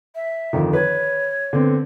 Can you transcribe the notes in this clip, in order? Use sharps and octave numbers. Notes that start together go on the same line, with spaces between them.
E5
F2 D3 D#3
B4 C#5
D3 B3 C4